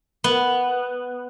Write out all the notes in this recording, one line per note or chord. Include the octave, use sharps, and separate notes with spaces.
B3